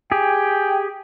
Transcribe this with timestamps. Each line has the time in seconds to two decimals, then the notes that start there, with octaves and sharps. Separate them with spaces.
0.12 G4 G#4 G5